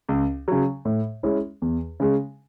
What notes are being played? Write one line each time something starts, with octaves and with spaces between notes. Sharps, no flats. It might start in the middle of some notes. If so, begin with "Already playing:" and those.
C#2
C#3 F#3
A2
G#3 C#4 E4
E2
C#3 G#3